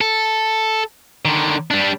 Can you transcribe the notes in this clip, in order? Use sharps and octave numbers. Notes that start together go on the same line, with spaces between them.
A4
D3 D#3
G3 D4